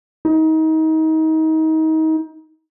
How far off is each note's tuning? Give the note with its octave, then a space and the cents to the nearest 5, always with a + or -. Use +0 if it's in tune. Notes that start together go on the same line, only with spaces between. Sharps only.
D#4 +30